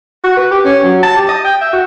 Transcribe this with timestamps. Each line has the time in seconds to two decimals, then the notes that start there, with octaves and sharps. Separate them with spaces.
0.24 F#4
0.37 B4
0.51 G4
0.65 C#4
0.84 F#3
1.03 A5
1.17 G4
1.29 D#5
1.45 G5
1.61 E5
1.73 F#4